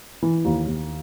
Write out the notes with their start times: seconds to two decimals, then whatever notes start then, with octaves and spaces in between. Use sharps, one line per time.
0.22 E3
0.45 D#2
0.67 D#2